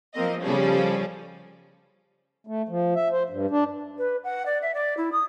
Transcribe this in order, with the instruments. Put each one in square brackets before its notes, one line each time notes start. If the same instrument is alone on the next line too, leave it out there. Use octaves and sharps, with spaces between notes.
[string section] F3 A#3 C4 D#5
C#3 F3 G3 C#4 G#4 A4
[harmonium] A3
F3
E5
C5
G2
D4
[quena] B4
F#5
D5
E5
D5
E4
D#6